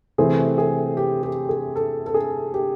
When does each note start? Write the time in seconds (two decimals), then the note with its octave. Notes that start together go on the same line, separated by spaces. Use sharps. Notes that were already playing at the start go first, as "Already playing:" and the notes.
0.18 C3 E3 A3 C4 G#4
0.58 G#4
0.97 G4
1.23 G4
1.49 G#4
1.76 A4
2.06 A4
2.14 G#4
2.54 G4